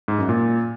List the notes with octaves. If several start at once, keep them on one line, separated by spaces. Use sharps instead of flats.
G#2
F#2
A#2